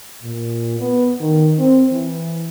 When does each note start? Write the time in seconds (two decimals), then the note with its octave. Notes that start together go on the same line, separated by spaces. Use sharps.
0.23 A#2
0.80 B3
1.20 D#3
1.59 C4
1.92 E3